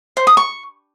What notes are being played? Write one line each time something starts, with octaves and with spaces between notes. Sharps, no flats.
C5
D#6
C#6